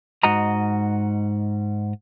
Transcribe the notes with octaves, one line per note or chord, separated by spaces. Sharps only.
G#2 F#4 D#5 A#5